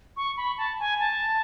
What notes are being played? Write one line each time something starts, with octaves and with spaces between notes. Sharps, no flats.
C#6
B5
A5
G#5
A5